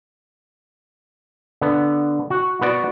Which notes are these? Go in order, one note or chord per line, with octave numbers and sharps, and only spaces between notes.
D3 B3
F#4
B3 F#4 D5